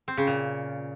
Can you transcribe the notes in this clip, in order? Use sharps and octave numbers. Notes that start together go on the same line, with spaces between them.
C4
C#3
A#2